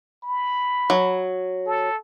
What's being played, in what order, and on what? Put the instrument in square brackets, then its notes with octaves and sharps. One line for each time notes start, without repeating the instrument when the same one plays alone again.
[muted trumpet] B5
[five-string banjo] F#3
[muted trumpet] A4